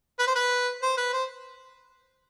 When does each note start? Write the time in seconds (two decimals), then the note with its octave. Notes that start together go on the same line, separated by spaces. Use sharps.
0.19 B4
0.27 C5
0.35 B4
0.82 C5
0.97 B4
1.13 C5